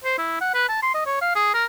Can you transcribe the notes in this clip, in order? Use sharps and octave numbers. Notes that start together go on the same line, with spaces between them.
C5
E4
F#5
B4
A5
C6
D#5
C#5
F5
G#4
A#4